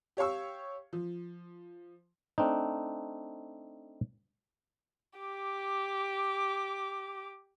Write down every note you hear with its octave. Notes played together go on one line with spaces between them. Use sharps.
G4 C#5 F5 C#6 E6
F3
A3 C4 D4 D#4
G4 D6